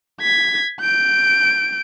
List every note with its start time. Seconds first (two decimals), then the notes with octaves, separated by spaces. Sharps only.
0.22 G#6 B6
0.81 G6 D7